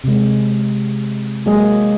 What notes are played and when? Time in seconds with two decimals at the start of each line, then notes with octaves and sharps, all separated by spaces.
0.04 C3 G#3
1.46 F#3 G#3 A#3 G#4 D#5